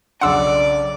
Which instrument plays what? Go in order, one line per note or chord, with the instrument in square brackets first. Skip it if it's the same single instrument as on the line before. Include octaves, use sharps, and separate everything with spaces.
[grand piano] B1 C#3 D4 [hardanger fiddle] D5 [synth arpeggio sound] F#5 C6 E6